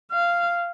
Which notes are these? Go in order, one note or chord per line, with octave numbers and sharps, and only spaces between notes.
F5